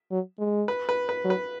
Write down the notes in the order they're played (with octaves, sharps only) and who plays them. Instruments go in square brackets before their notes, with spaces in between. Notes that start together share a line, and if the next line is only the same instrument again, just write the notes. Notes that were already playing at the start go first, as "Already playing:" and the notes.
[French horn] F#3
G#3
[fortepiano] B4
B4
B4
[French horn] F#3
[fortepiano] B4